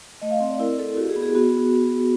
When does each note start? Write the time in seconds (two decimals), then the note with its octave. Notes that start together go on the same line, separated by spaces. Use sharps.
0.22 A3 D#5
0.31 F5
0.40 C4 D#5
0.50 D5
0.60 E4 A#4
0.78 E4 A4
0.97 F#4 G4
1.10 G#4
1.16 B3
1.22 G#4
1.35 B3 F#4